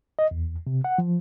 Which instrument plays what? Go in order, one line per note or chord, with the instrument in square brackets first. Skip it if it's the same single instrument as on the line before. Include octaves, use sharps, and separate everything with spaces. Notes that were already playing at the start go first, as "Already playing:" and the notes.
[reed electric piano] D#5
E2
C3
F#5
F3